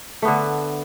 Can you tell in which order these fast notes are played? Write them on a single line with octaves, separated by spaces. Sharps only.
A3 B3 D3